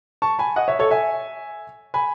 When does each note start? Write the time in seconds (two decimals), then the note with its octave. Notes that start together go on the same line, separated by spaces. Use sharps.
0.22 A5 C#6
0.39 G#5 B5
0.56 D#5 F#5
0.68 C#5 E5
0.79 A4 C#5
0.91 E5 G#5
1.94 G#5 B5